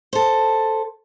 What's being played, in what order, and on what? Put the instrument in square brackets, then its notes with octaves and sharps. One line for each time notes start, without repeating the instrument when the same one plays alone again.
[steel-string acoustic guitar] A4 C5